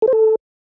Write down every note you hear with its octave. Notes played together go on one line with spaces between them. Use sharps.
A4
C5
A4